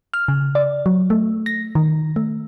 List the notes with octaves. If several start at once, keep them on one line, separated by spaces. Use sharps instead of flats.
F6
C#3
D5
F#3
A3
A#6
D#3
A3